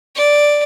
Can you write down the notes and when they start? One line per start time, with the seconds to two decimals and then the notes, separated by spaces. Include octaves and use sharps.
0.16 D5